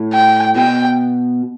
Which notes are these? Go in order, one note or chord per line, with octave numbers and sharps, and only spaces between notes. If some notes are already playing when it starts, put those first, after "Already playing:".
Already playing: A2
G5
B2 G5